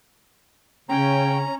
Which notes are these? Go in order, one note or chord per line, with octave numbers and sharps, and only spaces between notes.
C#3 C#4 G5 A#5